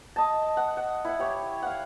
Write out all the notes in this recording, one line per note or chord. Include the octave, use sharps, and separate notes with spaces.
D#5 A5
F#5
F#5
E4 F#5
G4 C#5
F5 F#5